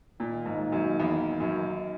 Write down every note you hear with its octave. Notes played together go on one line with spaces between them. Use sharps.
A#2 D#3 A#3 D#4
G#2
F#2
E2
F#2